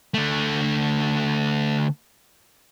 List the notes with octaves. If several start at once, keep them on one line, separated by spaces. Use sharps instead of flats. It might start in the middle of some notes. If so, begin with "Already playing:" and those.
D3 A3